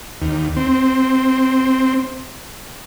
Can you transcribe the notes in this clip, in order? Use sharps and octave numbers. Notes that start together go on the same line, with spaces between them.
D#2
C4